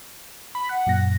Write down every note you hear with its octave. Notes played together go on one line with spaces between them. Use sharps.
B5
F#5
F#2 A#2 A#6